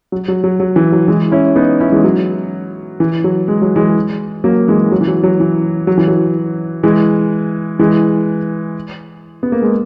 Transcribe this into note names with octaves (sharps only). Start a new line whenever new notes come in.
F#3
F#3
F#3
F#3
E3
F#3
E3 G#3
C#4 E4
B3 D#4
C#4 E4
E3 G#3
F#3
E3
F#3
G#3
F#3
E3 G#3
F#3 A#3
E3 G#3
F#3
E3
F#3
F#3
E3
F#3
E3
F#3
E3 G#3
E3 G#3
B3
A#3
G#3